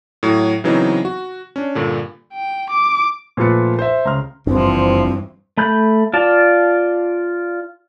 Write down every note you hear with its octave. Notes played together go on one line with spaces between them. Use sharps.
A2 F#3
C#3 E3 F#3 B3 C4 D#4
F#4
C#4 D4
G2 A#2 D3
G5
D6
A#2 F3 A3 F4 B4 C#7
C5 E5
C#2 A#5 C6 F6
F#1 G2 E3 F3 C4 D4
A3 B5 G6
F4 D5 A5